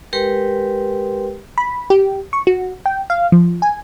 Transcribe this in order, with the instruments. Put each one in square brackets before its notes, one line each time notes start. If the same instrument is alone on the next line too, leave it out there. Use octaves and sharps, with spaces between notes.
[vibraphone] G#3 G4 A#4 B4 G5 C6
[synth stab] B5
G4
C#6
F#4
G5
F5
F3
G#5